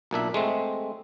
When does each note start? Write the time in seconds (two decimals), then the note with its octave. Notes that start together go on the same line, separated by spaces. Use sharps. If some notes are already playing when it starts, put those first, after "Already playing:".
0.11 B1 A#2 D4 E5
0.34 G#3 A3 C4